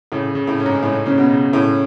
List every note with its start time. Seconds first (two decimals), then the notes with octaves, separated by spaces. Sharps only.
0.12 A2 C#3
0.35 C#3
0.47 A2
0.60 C#4
0.66 G#2
0.83 A2 G#3
1.06 C#3 C#4
1.18 B2
1.30 C#3
1.53 A2 C#4